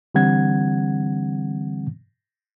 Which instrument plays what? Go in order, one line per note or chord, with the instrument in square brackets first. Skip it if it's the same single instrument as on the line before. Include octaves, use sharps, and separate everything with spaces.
[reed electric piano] D3 E3 G3 C4 F#5 G#6